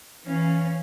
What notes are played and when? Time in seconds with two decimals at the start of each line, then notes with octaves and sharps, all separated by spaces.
0.24 E3 C#4 F5